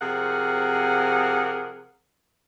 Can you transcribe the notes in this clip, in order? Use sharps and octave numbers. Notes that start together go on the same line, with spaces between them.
C3 F3 G#4 A#4 F#5